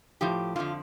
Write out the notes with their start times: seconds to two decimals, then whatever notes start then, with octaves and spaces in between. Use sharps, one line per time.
0.21 A2 F3 G4
0.56 F2 D3 F3 F4